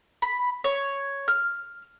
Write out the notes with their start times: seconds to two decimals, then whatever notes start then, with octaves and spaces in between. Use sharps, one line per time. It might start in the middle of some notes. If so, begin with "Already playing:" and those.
0.22 B5
0.64 C#5
1.28 F6